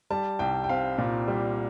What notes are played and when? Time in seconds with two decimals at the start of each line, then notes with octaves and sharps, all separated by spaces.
0.10 G3 A5
0.39 C2 G5
0.64 G5
0.69 C4 F5
0.98 A#2
1.28 G3